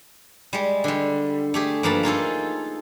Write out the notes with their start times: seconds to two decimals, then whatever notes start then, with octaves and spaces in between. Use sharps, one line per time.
0.53 G3 G#3
0.84 D3 G3
1.54 A3 G4 G#4
1.83 G2 F3 A#3 A5 B5
2.03 D#4 F4 G#4 A4